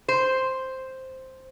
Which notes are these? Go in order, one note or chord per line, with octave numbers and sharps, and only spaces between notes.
C5